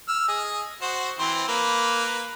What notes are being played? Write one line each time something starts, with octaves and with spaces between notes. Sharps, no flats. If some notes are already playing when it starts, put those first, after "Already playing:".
E6 F6
G#4 D#5
F#4 C5
E3 C4 C6
A#3 B4